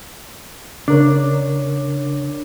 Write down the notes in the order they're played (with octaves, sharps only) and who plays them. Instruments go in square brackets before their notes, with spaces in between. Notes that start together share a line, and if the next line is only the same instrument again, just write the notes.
[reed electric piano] C#3 A#4 C#5 [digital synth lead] D4